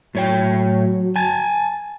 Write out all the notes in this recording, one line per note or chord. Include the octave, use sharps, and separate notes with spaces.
A2 F#3 C#5 G5
G#5 A5